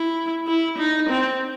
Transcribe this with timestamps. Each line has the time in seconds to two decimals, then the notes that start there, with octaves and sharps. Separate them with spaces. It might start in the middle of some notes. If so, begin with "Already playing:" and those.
Already playing: E4
0.47 E4
0.78 D#4
1.09 C4